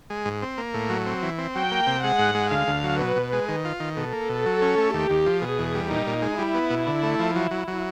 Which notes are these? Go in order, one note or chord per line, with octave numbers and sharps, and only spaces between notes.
G#3
G#2
C4
A#3
A2
F#3
C4
E3
C4
F#3 G5
A#3
C3
G#3 F#5
G#2
G#3
D2 F5
D2
F#3
B2 B4
B2
G#3
D#3
F4
D#3
B2 A4
A#3
B2
F#3
C#4
A3
D#2 G4
D#2
F3
B2 G#4
E2
G3
A#2 D#4
A#2
G#3
G3 E4
B3
B2
D3
A3
F3
F#3
F#3
F#3